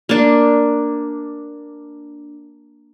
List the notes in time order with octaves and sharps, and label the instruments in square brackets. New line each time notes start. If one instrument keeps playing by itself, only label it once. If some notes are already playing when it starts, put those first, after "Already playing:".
[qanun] A#3 D4